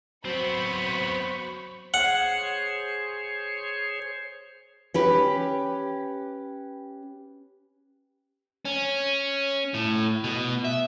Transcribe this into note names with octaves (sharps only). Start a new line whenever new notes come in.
F#3 B3 C4 C5 B5 C#6
G#4 C5 C#5 F#5
C#4 G4 B4
C#4
A2
B2
E5